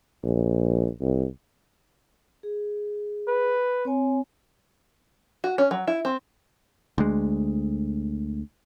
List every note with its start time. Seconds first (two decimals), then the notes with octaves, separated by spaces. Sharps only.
0.24 A#1
1.01 C2
2.43 G#4
3.27 B4
3.85 C4 C#5 G#5
5.44 F#4
5.58 C#4
5.71 F#3
5.87 E4
6.05 C4
6.98 D2 G#3